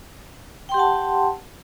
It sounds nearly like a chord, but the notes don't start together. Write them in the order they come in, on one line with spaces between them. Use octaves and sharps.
G5 C6 G4 F#5 A5